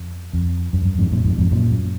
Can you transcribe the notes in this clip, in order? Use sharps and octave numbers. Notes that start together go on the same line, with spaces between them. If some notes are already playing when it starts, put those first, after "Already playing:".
Already playing: F2
F2
F#2
F#2
F2 G#2
F#2 A#2
F2 G#2
F2 G#2
F#2 A#2
F#2